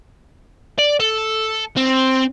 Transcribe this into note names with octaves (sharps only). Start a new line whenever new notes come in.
D5
A4
C4